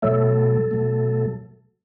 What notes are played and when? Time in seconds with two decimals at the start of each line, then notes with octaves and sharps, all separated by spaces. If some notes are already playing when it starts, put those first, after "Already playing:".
0.02 B2 F#3 A3 A4
0.71 B2 F#3 A3